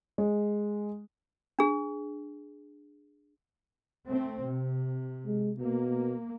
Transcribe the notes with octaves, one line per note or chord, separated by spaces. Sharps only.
G#3
D4 G#4
A3 C4
C3
G#3
B2 A#3